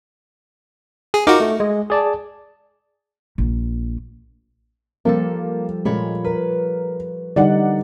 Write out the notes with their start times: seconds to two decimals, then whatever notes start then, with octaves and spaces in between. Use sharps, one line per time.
1.14 G#4
1.27 D#4 F4 F#4 A#4 D6
1.40 A3
1.60 G#3
1.90 G#4 D5 A5
3.38 A#1
5.05 F3 G3 A#3 A4
5.85 A#2 G#3 C#5 B5
6.24 A#4 B4
7.36 D3 G3 D#4 D5 F#5